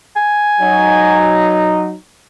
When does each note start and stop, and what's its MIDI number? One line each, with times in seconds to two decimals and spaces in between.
0.16 1.47 80
0.61 1.94 54
0.61 1.94 63